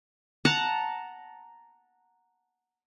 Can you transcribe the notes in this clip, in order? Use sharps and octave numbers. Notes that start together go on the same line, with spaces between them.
F#5 A5 A#5